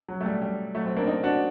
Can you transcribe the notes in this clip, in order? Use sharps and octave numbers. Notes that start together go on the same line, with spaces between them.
F#3
A3
G3
G3
F#3 A3
A3 C4
A#3 D4
C4 D#4
D4 F#4